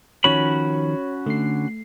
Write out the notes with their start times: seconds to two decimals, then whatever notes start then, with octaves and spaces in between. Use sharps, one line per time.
0.24 D#3 F3 C#4 F#4 C#5 B5
1.26 D3 A3 C7